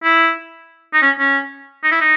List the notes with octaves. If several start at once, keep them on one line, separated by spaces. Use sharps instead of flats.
E4
D#4
C#4
C#4
D#4
E4
D#4